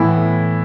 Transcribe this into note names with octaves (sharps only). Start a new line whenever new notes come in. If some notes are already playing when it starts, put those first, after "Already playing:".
Already playing: A2 E3 B3 E4